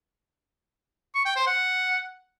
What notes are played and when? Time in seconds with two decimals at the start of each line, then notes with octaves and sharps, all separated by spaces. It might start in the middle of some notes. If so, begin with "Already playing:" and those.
1.15 C#6
1.25 G5
1.36 C5
1.47 F#5